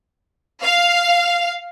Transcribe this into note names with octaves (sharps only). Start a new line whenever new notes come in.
F5